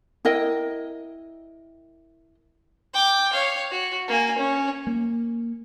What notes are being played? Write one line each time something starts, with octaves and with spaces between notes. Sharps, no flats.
E4 A#4 D#5 G5
G5 D6
C#5 F5
F#4
A#3 G#5
C#4
A#3